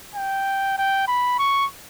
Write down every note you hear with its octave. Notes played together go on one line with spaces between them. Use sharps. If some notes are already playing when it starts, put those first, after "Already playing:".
G5
G5
B5
C#6